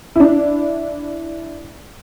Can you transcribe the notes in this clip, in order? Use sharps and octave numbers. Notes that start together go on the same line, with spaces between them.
D4 E4